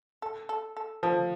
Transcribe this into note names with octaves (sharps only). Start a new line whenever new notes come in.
A4
A4
A4
F3 A4